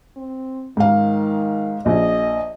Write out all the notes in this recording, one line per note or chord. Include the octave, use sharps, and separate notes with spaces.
C4
G#2 D#3 F5
A#1 D#5